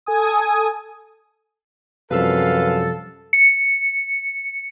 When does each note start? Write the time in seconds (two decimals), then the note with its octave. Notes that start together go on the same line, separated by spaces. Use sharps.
0.06 A4 G#5 D#6
2.11 F#2 C3 F3 G3 A4 B4 F5
3.33 C#7